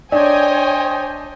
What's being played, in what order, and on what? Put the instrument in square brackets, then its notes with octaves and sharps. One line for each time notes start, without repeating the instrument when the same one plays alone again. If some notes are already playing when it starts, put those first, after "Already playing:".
[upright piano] D4 [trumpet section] C5 D#5 G5 [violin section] C#5 G#5